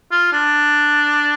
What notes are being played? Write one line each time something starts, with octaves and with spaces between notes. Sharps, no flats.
F4
D4